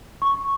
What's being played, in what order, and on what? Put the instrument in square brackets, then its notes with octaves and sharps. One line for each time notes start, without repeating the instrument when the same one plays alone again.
[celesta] C#6